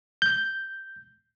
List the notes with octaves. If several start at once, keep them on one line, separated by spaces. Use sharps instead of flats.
G6